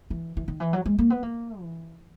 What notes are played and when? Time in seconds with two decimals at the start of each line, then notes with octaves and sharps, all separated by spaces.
0.10 E3
0.37 E3
0.48 D#3
0.60 E3
0.73 F#3
0.86 G#3
0.98 A#3
1.10 B3
1.23 A#3
1.61 E3